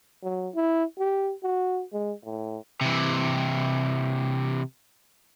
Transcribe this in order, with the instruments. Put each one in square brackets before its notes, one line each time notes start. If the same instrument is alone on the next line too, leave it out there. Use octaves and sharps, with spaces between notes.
[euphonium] F#3
E4
G4
F#4
G#3
A2
[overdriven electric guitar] C3 E3